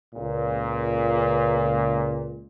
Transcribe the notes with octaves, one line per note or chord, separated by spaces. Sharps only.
C#2 A#2